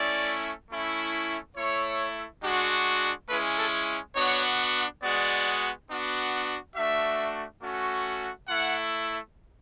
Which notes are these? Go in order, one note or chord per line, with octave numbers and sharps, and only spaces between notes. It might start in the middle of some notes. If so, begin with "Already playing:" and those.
Already playing: A3 C#4 E4 D5
A3 C#4 E4
A3 E4 C#5
G#3 D4 F#4
G#3 C#4 E4 B4
A4
B3 D4 F#4 C#5
G#3 B3 F#4 D5
B3 D4 F#4
A3 D4 F#4 E5
A3 C#4 F#4
A3 E4 F#5